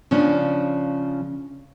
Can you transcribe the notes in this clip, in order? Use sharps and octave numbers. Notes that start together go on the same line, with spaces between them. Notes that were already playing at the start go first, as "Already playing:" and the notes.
C#3 F3 C#4 D4